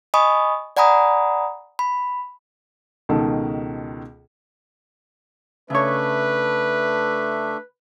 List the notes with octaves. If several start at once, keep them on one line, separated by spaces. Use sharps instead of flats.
D#5 G#5 B5 C#6 D#6
D5 F#5 G#5 A#5 B5 D#6
B5
C#2 B2 D#3 D#4 A4
C#3 A3 D4 B4 C#5 E5